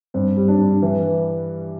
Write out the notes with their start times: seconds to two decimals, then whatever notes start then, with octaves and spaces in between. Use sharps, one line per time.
0.14 G2 C4
0.37 G3
0.48 D4
0.59 G2
0.82 E3